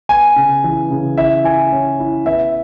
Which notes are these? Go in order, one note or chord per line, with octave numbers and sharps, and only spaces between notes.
B3 G#5
C#3
E3
C#3
E4 E5
E4 G#5
C#4
E4
B3 E5